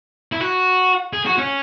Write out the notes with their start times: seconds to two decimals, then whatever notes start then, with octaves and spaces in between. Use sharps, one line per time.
0.32 E4
0.40 F#4
1.13 G#4
1.26 F#4
1.38 C#4